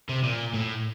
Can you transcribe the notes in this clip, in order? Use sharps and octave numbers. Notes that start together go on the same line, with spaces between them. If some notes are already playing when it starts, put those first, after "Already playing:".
C3
A#2
A2